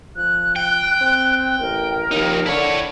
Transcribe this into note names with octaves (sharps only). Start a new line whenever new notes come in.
F3 F#6
G5
C4
A1 A#4
D#2 F3 D#4
D3 E4 C#5